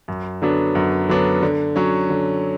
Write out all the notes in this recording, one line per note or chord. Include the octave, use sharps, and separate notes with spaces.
F#2
D3 F#3 B3 D4
F#2
D3 F#3 B3 D4
D3
F#3 C#4
D3